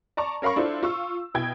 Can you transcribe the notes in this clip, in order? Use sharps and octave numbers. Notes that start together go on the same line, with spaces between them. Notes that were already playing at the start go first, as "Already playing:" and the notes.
D5 A5 A#5 C#6
C#4 A#4 F5 B5 C#6
D4 E4 F4 A4 C5
F4 C#6 E6
B2 E4 G5 G#6